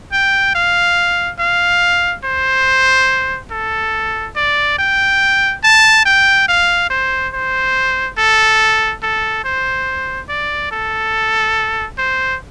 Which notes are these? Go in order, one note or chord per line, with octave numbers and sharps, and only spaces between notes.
G5
F5
F5
C5
A4
D5
G5
A5
G5
F5
C5
C5
A4
A4
C5
D5
A4
C5